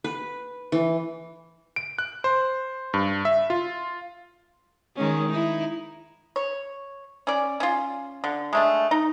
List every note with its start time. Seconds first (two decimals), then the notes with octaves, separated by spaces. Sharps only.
0.04 B4
0.72 E3
1.76 D7
1.98 F#6
2.24 C5
2.94 G2
3.25 E5
3.50 F4
4.96 D#3 G#3 C#4
5.29 D#4 E4
6.36 C#5
7.27 C#4 D5
7.60 C#4 F4
8.24 D3
8.53 G#3 A3 D4
8.91 D#4